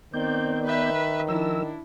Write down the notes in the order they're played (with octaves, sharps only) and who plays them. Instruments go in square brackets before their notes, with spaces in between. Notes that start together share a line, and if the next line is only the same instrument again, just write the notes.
[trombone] D#3 [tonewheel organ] B3 D5 G6 [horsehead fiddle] C4
[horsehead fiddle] B4 E5
[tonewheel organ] F3 A#4 E6 [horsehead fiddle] D4 E4